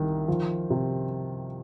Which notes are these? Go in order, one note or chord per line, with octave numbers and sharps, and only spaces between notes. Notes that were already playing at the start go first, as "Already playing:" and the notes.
Already playing: C2 D#3
F3
C3